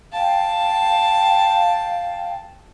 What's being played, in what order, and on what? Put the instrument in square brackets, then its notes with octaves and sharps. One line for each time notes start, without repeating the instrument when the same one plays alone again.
[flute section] F5 G5 [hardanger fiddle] A5